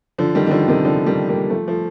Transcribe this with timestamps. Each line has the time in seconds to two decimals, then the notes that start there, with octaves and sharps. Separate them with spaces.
0.18 D3 F3
0.35 D#3 G3
0.46 D#3
0.51 D3 F3
0.68 C3 D#3
0.85 D3 F3
1.06 D#3 G3
1.28 G3 A#3
1.50 F3 A3
1.67 F3 A3